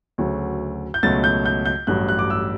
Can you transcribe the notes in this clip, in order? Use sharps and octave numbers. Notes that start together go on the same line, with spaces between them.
D2 C#3 F#3 A3
G6
C#2 B2 F#3 A3 A6
G6
G6
G6
A1 G2 F#3 A3 F#6
F#6
D6
E6